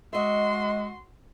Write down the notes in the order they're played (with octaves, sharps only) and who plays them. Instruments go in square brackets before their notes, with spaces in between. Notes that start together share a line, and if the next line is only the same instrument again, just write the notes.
[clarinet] G#3 [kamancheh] F#4 C6 [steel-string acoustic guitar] D#5 E5